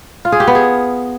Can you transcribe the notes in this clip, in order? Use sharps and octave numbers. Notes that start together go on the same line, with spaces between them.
F4
G#4
G4
B3
G#4